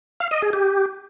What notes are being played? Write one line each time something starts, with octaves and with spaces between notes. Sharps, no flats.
F5
D#5
G#4
G4